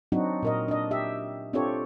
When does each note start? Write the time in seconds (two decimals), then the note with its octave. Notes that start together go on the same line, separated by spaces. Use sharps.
0.12 F#3 C4 D4 D#4 F#4
0.43 A#2 A#4 D#5
0.68 D4 D#5
0.91 G4 E5
1.53 C4 D4 F4 G4 A4 C#5